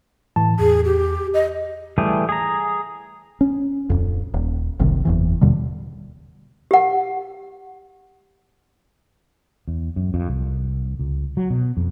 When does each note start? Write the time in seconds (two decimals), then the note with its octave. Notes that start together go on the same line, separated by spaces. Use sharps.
0.36 A2 E3 A5
0.60 E2 G#4
0.85 G4
1.34 D#5
1.98 E3 G3 A3 G4 G#4
2.29 G#4 A#5
3.41 C#4
3.90 D1 G1 F2
4.34 D#1
4.79 F#1 C2 C3 D#3
5.05 F#1 E2 E3
5.41 D#2 B2 D3 G3
6.71 G4 F#5
9.68 E2
9.96 F#2
10.14 F2
10.28 C2
10.99 C#2
11.37 F#3
11.50 B2
11.77 F2